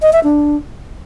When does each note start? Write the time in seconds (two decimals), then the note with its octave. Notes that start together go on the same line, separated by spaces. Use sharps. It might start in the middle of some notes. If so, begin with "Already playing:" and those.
0.02 D#5
0.13 E5
0.24 D4